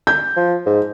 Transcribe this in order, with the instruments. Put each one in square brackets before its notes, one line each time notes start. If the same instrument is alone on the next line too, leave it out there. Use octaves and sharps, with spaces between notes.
[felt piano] G6
[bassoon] F3
G#2